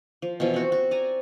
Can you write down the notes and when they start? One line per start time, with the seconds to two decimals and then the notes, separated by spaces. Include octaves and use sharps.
0.22 F3
0.40 B2 E3 F3
0.54 C4 F#4
0.72 F#4
0.91 D5 G#5 A#5